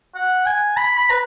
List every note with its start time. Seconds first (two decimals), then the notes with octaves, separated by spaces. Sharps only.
0.15 F#5
0.46 G#5
0.77 B5
0.97 B5
1.10 B4